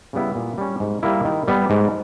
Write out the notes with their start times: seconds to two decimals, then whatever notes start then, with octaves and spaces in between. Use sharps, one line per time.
0.13 C#3 G3 B3 E4
0.35 A#2
0.58 G3 C#4
0.80 G#2
1.03 G3 A#3 E4
1.25 D#3
1.48 G3 B3
1.70 G#2